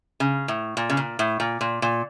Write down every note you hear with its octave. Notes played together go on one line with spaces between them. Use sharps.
C#3
A2
A#2
C#3
A#2
A2
A#2
A#2
A#2